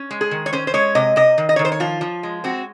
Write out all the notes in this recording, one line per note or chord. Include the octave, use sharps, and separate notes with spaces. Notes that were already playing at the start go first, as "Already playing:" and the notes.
Already playing: C#4
G#3
G#4
D#3
C#5
C#4 C5
C5
G#3 C#5
C3 D#5
C3 D#5
D#3
D#5
D#3 C#5
C5
C#5
F3 F4
F3
G#3
C4 F#4